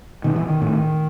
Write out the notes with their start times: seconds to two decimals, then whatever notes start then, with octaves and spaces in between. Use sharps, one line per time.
0.24 B2 D#3
0.36 E3
0.47 D#3
0.61 A2